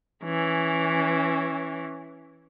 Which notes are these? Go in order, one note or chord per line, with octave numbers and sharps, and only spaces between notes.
E3 C#4